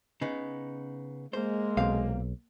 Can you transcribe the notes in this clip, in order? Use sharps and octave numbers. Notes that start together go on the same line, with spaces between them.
C#3 B3 D#4
G#3 A#3 C5
B1 A#2 C4 F5